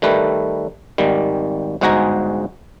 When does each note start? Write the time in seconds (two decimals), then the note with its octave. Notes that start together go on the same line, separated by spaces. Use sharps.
0.02 D#3 G3 A3 B4
0.98 G#1 D#3 G3
1.81 G1 G#2 G#3 F#4 G#5 A#5